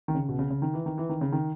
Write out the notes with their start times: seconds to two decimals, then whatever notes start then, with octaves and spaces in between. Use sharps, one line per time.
0.08 D#3
0.14 C#3
0.29 B2
0.39 C#3
0.50 C#3
0.62 D#3
0.74 E3
0.86 D#3
0.98 E3
1.09 D#3
1.21 C#3
1.32 D#3